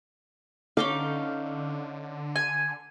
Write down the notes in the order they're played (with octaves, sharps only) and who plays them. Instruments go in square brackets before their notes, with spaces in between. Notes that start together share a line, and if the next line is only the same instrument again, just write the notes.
[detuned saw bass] D3 [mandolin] C#4 D#4 F5 [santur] D6
[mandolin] G#5